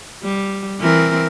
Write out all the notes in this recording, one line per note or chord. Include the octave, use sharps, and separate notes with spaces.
G3
E3 C4 A#4